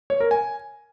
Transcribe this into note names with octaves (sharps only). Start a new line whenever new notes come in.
C#5
A#4
G#5